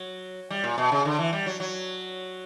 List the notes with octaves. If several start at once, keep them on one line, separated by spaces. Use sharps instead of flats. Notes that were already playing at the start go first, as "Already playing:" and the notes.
Already playing: F#3
G3
A#2
B2
C#3
D3
E3
G3
F#3
F#3